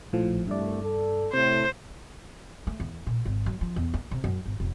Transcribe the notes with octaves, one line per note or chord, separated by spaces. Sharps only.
A#1 A2 F3
C2 G2 A3 D5
A4
A2 C3 C5
A3
E2
A#2
G#1
F#3
F3
E2
A#3
C3
F#2
G#1
F1